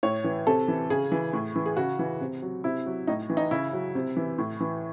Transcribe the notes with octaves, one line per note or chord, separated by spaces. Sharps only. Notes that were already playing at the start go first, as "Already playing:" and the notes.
A2 C#5
E3
C3 A4
E3
C#3 G#4
E3
A2
E3
G#4
C#3 F#4
E3
C3
F#3
C3 E4
F#3
A2 D#4
E3
D#4
C#3 E4
F#3
C3
E3
A2
E3